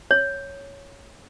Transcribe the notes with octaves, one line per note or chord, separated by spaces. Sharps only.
C#5